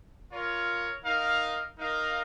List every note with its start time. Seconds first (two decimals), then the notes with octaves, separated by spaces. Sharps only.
0.32 F4 A#4 C#5
1.04 D#4 A#4 F5
1.77 D#4 A#4 F5